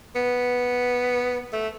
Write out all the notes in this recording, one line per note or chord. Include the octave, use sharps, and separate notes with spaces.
B3
A3